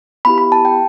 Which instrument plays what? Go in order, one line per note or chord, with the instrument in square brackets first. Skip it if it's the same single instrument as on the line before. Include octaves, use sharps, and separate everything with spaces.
[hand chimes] B3 E4 G4 B5
B5
A5
G5